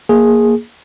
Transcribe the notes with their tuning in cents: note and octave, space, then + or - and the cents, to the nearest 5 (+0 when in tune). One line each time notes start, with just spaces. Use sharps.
A#3 +0 G#4 +0